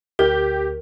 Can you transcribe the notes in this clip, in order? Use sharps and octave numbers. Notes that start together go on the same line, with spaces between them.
D2 G4 A#4